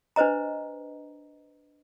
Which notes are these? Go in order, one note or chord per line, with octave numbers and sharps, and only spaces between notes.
D4 B4 C5 D#5 A#5